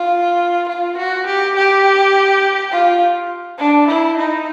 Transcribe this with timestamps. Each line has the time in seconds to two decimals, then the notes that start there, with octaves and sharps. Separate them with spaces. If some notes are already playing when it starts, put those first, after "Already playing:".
Already playing: F4
0.68 F4
0.97 F#4
1.26 G4
1.56 G4
2.72 F4
3.59 D4
3.88 E4
4.17 D#4